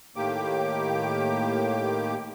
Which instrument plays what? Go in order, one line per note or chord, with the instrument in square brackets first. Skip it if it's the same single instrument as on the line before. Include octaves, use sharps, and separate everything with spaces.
[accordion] A2 D#3 A#3 G4 D6